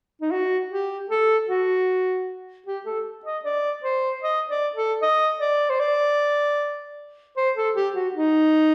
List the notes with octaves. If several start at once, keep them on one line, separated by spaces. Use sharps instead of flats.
D#4
F#4
G4
A4
F#4
G4
A4
D#5
D5
C5
D#5
D5
A4
D#5
D5
C5
D5
C5
A4
G4
F#4
D#4